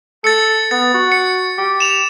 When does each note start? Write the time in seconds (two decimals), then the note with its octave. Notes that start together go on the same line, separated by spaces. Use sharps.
0.24 A4 A6 C#7
0.71 B3 A6
0.94 F#4
1.12 C#7
1.58 G4
1.80 E7 F7